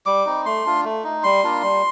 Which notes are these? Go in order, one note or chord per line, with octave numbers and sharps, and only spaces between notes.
G3 D6
C4 D#4
A3 C6
D4 F4
A3
D#4
G3 C6
A#3 D4 F4
G3